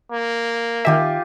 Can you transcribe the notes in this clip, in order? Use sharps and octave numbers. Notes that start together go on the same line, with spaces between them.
A#3
D#3 F4 G4 E5 G#5